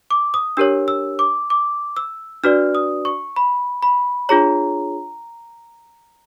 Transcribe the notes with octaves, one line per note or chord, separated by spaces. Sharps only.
D6
D#6
D4 G4 A#4 C#5 E6
E6
D6
D6
E6
D4 F#4 B4 D5 F6
D#6
C#6
B5
B5
D4 F4 G#4 C#5 A#5